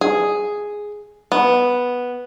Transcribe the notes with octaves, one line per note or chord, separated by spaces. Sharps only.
G#4
B3